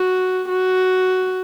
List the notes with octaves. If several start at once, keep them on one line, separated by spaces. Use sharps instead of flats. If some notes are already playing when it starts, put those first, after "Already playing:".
Already playing: F#4
F#4